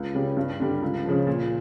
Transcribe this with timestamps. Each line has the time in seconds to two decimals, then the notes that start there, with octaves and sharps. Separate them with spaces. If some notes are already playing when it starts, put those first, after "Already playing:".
Already playing: C#2
0.14 C#3 G3
0.37 G2
0.60 D3 G3
0.82 C#2
1.05 C#3 F3
1.27 A#2